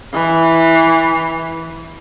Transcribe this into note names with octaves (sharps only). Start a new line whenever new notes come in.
E3